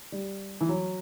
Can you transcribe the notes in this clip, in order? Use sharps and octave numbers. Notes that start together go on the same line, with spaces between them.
G3
E3
F#3